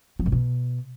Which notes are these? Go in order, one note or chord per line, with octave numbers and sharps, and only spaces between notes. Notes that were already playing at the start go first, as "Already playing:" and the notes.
F#3
A#2
B2